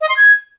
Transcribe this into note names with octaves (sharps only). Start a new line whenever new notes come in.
D#5
C6
G#6